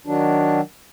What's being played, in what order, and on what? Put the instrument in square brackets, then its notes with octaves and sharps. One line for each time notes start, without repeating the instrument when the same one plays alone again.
[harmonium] D#3 F#3 D4